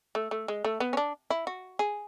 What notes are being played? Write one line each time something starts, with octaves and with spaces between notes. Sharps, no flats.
A3
A3
G#3
A3
B3
C#4
D4
E4
F#4
G#4